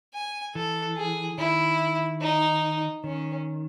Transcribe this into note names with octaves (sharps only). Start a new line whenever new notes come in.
G#5
E3 A4
G#4
D#3 E4
D#4
D#3 C#4